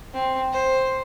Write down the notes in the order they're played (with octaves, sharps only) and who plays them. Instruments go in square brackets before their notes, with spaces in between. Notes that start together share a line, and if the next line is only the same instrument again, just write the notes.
[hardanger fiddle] C4
C5